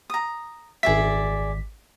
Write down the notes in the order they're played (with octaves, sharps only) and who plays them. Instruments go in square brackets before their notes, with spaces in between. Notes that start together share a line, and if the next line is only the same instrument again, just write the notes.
[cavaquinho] A#5 D#6
[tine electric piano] G#1 B6 [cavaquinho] G#4 D5 E5